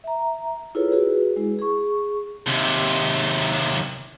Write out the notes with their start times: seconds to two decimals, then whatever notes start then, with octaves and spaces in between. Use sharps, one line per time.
0.04 E5 A#5
0.75 E4 F4 G#4 A4 B4 C#5
0.91 F#4 G#4 B4
1.36 G#3 E4 G#4
1.59 G#4 C#6
2.47 D#2 C3